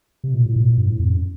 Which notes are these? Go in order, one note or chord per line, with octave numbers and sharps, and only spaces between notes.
C3
A#2
A2
A#2
A#2
G2
A2
F2
F#2